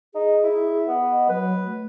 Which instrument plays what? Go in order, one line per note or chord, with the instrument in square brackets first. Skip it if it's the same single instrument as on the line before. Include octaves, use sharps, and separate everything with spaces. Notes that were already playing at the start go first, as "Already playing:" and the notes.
[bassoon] D#4 [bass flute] G#4
[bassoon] E4
B3
[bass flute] D#5
[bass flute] F#3 [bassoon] B4
[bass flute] A3